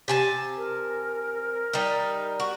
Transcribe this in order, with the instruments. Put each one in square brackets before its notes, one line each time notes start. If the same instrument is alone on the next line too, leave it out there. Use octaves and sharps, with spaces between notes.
[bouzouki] C3 G#5 A5
[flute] A#4
[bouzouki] G3 D#4
F#4